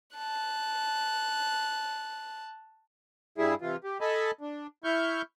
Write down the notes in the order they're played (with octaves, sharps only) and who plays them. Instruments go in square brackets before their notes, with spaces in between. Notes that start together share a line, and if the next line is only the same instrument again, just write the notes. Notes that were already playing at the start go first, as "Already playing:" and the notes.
[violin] A5 F#6
[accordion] G2 G3 E4 G#4
C3 E3 F4
G4
A4 D#5 G#5 A5 B5
D4
E4 C#6 F6 G6